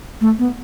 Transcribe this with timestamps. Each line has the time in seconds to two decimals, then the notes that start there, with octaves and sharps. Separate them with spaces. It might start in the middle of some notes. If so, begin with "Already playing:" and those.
0.21 A3
0.39 B3